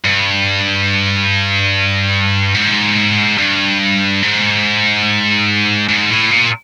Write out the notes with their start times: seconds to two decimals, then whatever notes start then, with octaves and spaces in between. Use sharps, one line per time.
0.04 G2
2.55 G#2
3.38 G2
4.22 G#2
5.89 G#2
6.10 A2
6.31 A#2